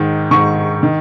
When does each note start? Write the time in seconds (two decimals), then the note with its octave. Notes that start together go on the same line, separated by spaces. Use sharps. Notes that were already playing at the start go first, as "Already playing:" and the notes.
Already playing: G#2 D#3
0.31 G#2 D#3 C#6
0.83 D#3